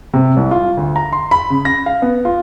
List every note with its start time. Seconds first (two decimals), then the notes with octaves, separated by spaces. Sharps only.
0.14 C3
0.37 C2
0.51 F4
0.77 D2
0.96 A#5
1.13 C6
1.31 B5
1.50 C#3
1.65 A#6
1.86 F5
2.02 B3
2.25 F4